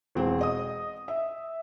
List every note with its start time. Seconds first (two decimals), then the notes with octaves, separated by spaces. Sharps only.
0.15 E1 C4
0.41 D#5 D#6
1.08 E5